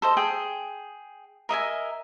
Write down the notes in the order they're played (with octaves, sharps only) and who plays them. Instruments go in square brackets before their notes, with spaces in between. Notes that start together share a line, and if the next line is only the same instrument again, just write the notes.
[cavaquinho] A4 C5 D#5
G#4 G5 D#6
A#4 D#5 E5 G#5